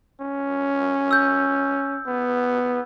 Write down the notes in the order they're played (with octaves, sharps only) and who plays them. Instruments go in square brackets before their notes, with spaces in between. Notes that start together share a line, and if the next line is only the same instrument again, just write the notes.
[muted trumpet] C#4
[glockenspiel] E6 G6
[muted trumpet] B3